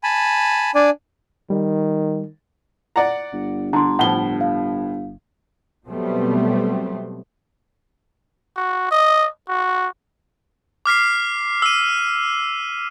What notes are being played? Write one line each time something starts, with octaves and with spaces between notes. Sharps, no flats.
G#5 A5 B5
D4 D5 G#5
D#3 G3
D5 F#5 A#5
G1
D3 A#5 C6
A2 F3 F#5 G7
F5
B2 F#3 G3 A3 B3 C4
F#4
D#5
F#4
D6 F6 B6 C7
E6 D#7